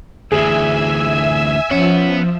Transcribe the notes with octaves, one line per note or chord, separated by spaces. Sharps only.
D2 E3 G#4 E5 G#5 E6
F3 B3 C#4 F#5